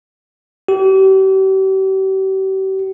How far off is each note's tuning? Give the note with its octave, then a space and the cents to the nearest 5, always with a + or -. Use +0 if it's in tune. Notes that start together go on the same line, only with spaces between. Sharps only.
G4 -40